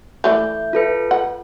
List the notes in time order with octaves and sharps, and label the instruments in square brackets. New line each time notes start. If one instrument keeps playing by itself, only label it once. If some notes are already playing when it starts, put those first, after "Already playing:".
[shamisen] E3 A3 D5 [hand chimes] G6
[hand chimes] F4 A4 B4
[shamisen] F#5